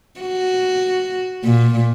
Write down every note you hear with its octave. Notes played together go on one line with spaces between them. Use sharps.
F#4
A#2